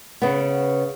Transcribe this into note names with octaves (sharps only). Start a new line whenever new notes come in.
C#3 B3